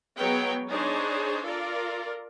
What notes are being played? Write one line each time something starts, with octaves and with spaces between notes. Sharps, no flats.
F#3 G#3 B3 B4 C#5 G5
D4 D#4 G#4 C5 C#5
F4 A4 A#4 D5